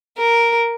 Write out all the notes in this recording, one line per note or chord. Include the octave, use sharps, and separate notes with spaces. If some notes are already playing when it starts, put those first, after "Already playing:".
A#4